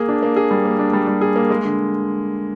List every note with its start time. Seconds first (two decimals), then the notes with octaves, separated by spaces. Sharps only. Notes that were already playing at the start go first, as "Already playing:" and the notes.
Already playing: A#3 G#4
0.09 D4
0.23 A#3
0.36 G#4
0.51 G3
0.65 A#3
0.79 D4
0.93 G3
1.07 G3
1.21 G#4
1.36 A#3
1.50 G#3
1.65 D3